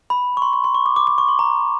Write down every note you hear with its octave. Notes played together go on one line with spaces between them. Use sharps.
B5
C#6
C6
C#6
C6
C#6
D6
D6
D6
C#6
C6
A#5